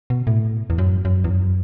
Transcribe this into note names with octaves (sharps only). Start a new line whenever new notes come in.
B2
A2
E2
F#2
F#2
E2
F#2